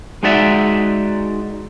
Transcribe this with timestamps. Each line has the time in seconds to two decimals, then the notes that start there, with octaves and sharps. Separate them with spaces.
0.23 G#3 D#4 F#4 D5 E5